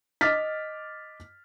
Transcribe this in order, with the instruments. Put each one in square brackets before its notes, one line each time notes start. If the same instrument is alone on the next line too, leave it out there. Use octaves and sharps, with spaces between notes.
[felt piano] D#5 D6 F6 A6 B6